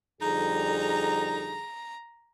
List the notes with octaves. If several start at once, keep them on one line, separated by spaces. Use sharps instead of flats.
F2 D3 G3 D#4 G#4 A#5